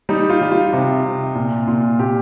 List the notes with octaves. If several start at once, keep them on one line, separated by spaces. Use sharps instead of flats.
G3 D#4
F4
G3
F4
C3
C3
A#2
A#2
A#2 G4